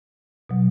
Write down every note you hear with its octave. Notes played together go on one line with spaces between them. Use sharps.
B2 F#3